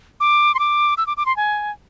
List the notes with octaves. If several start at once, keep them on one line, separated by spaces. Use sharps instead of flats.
D6
C6
D6
E6
D6
D6
C6
G#5